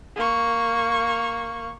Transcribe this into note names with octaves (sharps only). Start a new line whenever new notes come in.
A#3 C#6